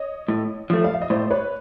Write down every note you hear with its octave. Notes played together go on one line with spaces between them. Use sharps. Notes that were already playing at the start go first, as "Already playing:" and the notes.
Already playing: C#5 D#5
A2
F3 A3
F5
E5
D#5
A2 C5 D5
B4 C#5